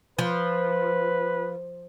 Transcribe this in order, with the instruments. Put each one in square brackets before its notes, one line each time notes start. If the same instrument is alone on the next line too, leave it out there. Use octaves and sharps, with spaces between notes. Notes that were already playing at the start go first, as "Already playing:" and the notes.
[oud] F3 [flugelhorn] B4